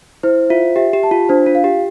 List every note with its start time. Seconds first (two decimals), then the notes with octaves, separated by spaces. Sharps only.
0.23 E4 C5
0.49 F4 E5
0.76 G4 E5
0.93 G4
1.03 A5
1.11 F4
1.29 D4 C5
1.46 F4
1.55 F5
1.64 G4